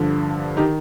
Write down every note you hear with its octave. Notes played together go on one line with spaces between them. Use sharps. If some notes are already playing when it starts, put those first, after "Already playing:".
Already playing: G2 D3 F3
D#3 D#4 G4